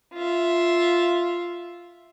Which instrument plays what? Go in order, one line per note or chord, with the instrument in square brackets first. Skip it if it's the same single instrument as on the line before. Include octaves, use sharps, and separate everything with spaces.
[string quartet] F4 E5